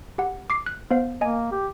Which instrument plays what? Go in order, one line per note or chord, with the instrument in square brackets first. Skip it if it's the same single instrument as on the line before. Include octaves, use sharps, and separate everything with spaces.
[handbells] G4 F#5
D6 C7
F#6
B3 C5 F5
[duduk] A#3 [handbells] D#5 G#5
[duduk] G4